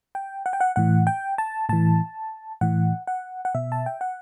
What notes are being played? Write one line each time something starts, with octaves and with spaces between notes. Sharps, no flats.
G5
F#5
G5
F#5
A2 E3 F#5
G5
A5
A2 E3 A5
A2 E3 F#5
F#5
F#5
B2 E5
A5
G5
F#5